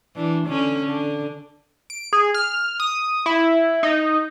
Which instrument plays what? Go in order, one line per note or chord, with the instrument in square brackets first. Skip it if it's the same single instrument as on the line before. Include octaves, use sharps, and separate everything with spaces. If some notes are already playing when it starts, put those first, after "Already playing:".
[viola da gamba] E3 D4
D3 C#4
D3
[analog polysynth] D7
G#4
F6
D#6
E4
D#4